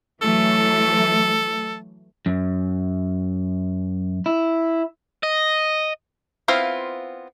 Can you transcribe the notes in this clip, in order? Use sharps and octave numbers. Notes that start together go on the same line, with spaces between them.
E3 F#3 A3 A4
F#2
E4
D#5
B3 C4 E4 F4 F5